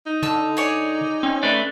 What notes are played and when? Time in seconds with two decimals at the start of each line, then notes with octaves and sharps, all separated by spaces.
0.06 D#4
0.23 D3 A5 E6
0.57 G#4 C#5 D5
1.23 C4 C#4
1.43 A3 B4 D5